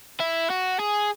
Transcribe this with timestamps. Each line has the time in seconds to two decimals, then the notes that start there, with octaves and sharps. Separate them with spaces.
0.20 E4
0.50 F#4
0.79 G#4